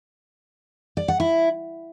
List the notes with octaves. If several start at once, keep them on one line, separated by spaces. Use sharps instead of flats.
D5
F#5
E4